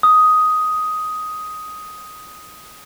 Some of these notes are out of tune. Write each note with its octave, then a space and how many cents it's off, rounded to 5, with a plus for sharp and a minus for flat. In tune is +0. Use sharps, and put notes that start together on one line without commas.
D#6 +5